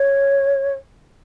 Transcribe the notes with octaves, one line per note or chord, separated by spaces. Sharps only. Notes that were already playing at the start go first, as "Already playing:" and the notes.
Already playing: C#5